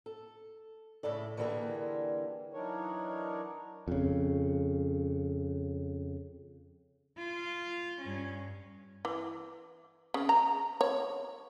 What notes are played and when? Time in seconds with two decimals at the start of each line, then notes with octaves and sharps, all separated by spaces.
0.06 A4
1.03 A2 C#3 E4 A4 D5
1.37 D3 E3 G3 A3 A#3 G#4
2.53 E3 F#3 D4 D#4 A#4 C#5
3.88 F2 C#3
7.17 F4
8.01 G2 C#4
9.05 E3
10.14 C#3
10.29 A#5
10.81 C#5